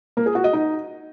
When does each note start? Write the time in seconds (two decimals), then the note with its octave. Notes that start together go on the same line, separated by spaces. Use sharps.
0.17 A#3
0.26 G#4
0.35 F#4
0.44 D#5
0.53 D#4